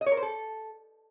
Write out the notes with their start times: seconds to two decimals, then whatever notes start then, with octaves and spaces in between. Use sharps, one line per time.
0.01 D#5
0.06 C#5
0.12 A#4
0.17 C5
0.22 A4